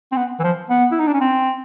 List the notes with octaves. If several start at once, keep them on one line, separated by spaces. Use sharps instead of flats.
C4
B3
E3
F3
B3
E4
D#4
D4
C#4
C4